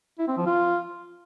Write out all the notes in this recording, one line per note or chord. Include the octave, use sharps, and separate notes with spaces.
E4
C4
F3
F4